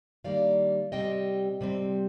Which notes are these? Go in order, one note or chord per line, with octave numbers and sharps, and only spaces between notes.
D#3 G3 A#3 D5 F5
C3 G3 C4 D#5 G5
C3 G3 C4